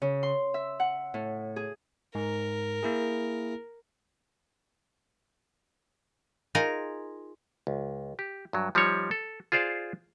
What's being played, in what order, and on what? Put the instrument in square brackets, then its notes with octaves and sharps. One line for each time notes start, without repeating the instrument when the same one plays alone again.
[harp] C#3
C6
E5
F#5
A2
G#4
[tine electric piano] G#2 [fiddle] A#4
[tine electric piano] A#3 E4 G#4
[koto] D#4 F4 G#4 A#4 D#5
[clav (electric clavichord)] C#2
G4
G2 F#3
F3 G3 D#4 C#5
A4
F4 G#4 C5 D5 F5